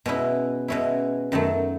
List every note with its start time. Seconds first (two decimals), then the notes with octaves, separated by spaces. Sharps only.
0.06 B2 G#3 C#4 E4
0.68 B2 G#3 C#4 E4
1.32 F#2 D#3 F#3 A3